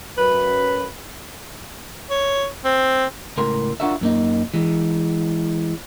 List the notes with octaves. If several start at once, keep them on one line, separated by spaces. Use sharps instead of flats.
F#2 B4
C#5
C4
C#2 A2 A#4 C6
D4 F4 F#4 A#4 E5
F#2 A#3 D#4
E3 G#3